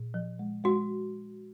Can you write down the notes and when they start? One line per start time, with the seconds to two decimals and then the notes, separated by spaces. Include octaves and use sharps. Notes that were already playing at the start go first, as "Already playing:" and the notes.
Already playing: A#2
0.14 F3
0.39 G#3
0.64 G#3 F#4